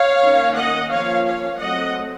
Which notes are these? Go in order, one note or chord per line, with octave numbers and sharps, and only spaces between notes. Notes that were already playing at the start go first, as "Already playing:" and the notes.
Already playing: C#5 F5
D#3 A#3 C#4
D#5 F#5
F3 A#3 C#4 C#5 F5
C#5 F5
F#3 A3 C4 D#5 F#5